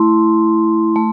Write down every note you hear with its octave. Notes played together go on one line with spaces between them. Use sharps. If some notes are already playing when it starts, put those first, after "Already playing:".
Already playing: A3 E4 C6
A3